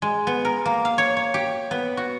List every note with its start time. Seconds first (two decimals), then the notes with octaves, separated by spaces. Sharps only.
0.02 G#3
0.27 B3
0.45 A#4
0.65 A#3
0.85 F5
0.98 C#5
1.17 C#5
1.34 G4
1.71 B3
1.97 F#4